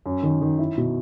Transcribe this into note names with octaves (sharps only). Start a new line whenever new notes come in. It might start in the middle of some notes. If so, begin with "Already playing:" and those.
F#2
D#3
D#3
E4
B2